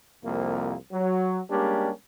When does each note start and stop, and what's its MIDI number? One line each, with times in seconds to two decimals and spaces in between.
0.24 0.75 36
0.24 0.75 41
0.24 0.75 48
0.24 0.75 58
0.92 1.40 54
1.50 1.90 55
1.50 1.90 56
1.50 1.90 58
1.50 1.90 61
1.50 1.90 62
1.50 1.90 67